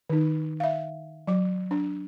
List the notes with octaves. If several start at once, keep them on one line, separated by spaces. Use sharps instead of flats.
D#3 D#4
E5 F5
F#3 D6
D4